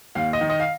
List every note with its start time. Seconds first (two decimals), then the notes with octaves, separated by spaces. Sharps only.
0.15 D#2 F5
0.33 D#5
0.41 D#3
0.50 D#5
0.60 F5